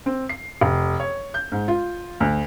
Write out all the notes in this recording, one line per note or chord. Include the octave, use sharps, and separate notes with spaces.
C4
C7
F1
C#5
G6
G#2
F4
D2